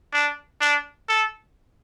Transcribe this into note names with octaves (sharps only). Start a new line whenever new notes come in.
D4
D4
A4